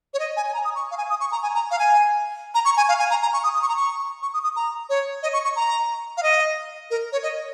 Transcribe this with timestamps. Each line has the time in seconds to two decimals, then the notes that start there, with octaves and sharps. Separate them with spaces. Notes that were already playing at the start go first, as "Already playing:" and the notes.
0.14 C#5
0.19 D#5
0.37 G#5
0.48 G#5
0.54 A#5
0.65 D#6
0.75 C#6
0.91 F5
0.98 G#5
1.10 D#6
1.21 C#6
1.32 A#5
1.43 G#5
1.55 A#5
1.71 F5
1.79 G#5
2.55 A#5
2.65 C#6
2.77 G#5
2.89 F5
2.99 G#5
3.11 A#5
3.22 A#5
3.33 C#6
3.44 D#6
3.54 D#6
3.62 C#6
3.69 A#5
3.76 C#6
4.22 C#6
4.34 D#6
4.44 D#6
4.56 A#5
4.89 C#5
5.23 D#5
5.33 C#6
5.45 C#6
5.56 A#5
6.17 F5
6.23 D#5
6.91 A#4
7.12 C#5
7.23 D#5